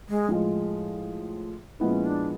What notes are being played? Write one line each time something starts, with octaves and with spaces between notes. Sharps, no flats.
G#3
A2 F3 G#3
A#2 F3 G#3 B3 C#4 E4
D4